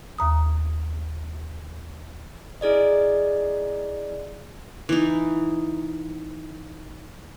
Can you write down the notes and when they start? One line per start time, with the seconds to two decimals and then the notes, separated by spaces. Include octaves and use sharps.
0.18 D#2 A#5 D#6
2.61 E4 G#4 D5 D#5
4.89 E3 D#4